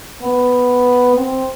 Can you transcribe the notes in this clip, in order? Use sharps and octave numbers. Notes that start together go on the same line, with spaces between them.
B3
C4